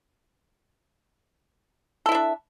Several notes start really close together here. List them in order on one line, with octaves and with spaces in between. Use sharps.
A4 E4 E5 D4